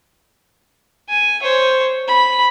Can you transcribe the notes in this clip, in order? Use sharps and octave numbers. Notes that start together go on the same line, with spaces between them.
G#5
C5 C#5
B5